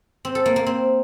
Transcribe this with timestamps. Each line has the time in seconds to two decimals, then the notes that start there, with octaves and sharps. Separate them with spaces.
0.25 C4
0.35 A4
0.46 A#3
0.56 A#3
0.66 C4